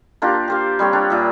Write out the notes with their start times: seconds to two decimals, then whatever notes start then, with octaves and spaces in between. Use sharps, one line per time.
0.22 A#3 D4 F4 G4
0.48 G4 C5 F5
0.79 G3 C4 C#5 G5
0.93 D4 C#5
1.10 A#2 E5